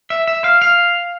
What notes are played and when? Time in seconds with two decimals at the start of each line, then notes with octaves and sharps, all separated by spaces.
0.10 E5
0.28 E5
0.44 F5
0.62 F5